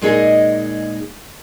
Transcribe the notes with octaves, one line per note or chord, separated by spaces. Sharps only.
A#2 G#3 D#4 G#4 D#5